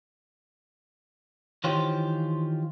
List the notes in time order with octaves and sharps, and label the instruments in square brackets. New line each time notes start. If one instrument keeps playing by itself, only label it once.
[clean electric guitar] D#3 E3 F4 G4 C5 C#5